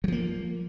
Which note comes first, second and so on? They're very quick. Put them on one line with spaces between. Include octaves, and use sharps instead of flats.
F#3 F3 A#3